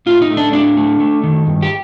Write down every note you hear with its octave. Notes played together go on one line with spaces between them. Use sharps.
A2 F4
D#4
A3
D4
A2 D4
A3
A3
D#3
G2
G4